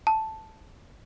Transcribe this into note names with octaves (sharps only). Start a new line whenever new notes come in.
A5